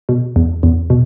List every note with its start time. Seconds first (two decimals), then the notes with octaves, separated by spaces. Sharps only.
0.09 B2
0.36 E2
0.63 E2
0.90 B2